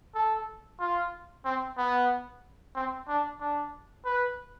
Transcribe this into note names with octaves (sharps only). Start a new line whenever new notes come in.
A4
F4
C4
B3
C4
D4
D4
B4